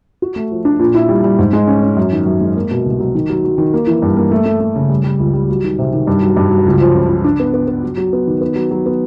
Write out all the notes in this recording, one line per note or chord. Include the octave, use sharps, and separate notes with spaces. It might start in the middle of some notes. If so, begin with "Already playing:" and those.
F#4
A3
F3
D4
A#2
E4
G3
G3
G#2
G#3
C#4
C#4
F#2
D#3
F#2
G#3
A#3
B2
C2
F#3
D#3
F#3
F#3
D#3
A#3
E3
G2
A#3
A3
A3
A3
C#3
G3
G3
C#2
G3
F#3
D#3
C3
D#3
G2
F#3
G2
F#3
C#2
F3
C#3
F3
D4
B3
B3
B3
F#3
F#3
B3
D#3
B3
F#3
F#3
B3